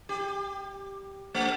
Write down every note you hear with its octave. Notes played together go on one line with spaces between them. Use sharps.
G4
A3